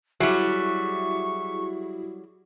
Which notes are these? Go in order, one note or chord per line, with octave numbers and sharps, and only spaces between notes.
F#3 G3 E4 F#4 G#4 E5 C#6